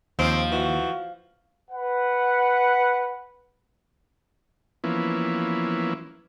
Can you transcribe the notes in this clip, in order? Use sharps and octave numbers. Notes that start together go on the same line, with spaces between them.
D#2 F3 C4
E3 F#4
B4 F#5
E3 F3 A#3 B3 C#4 E4